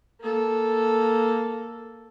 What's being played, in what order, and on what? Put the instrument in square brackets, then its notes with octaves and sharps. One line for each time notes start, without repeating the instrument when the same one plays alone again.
[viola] A#3 A4